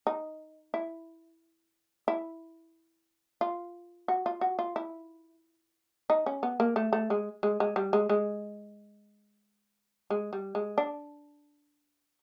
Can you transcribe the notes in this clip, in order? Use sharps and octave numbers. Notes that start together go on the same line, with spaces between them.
D#4
E4
E4
F4
F#4
F4
F#4
F4
E4
D#4
C#4
B3
A#3
A3
A3
G#3
G#3
G#3
G3
G#3
G#3
G#3
G3
G#3
D4